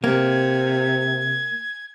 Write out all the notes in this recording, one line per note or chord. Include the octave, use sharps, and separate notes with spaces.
C3 A#3 G#6